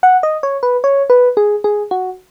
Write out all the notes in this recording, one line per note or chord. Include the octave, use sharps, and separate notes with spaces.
F#5
D#5
C#5
B4
C#5
B4
G#4
G#4
F#4